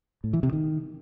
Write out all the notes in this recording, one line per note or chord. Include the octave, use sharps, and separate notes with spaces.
A2
E3
C3
D#3